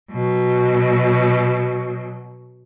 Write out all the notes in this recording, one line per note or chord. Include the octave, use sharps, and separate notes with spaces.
B2 F#3